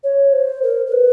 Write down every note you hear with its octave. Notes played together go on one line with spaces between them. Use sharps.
C#5
C5
A#4
A#4
B4